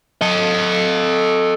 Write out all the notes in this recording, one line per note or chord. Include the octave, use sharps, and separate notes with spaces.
A4 D#5